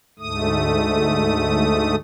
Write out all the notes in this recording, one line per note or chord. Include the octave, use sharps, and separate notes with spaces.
D2 G#2 A3 D#6